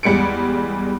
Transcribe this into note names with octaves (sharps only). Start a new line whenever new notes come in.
E2 G3 G#3 C#7 D7